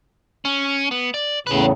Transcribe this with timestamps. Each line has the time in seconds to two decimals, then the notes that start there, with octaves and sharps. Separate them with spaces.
0.45 C#4
0.91 B3
1.14 D5
1.47 E2 A2 C#3 G#4 B4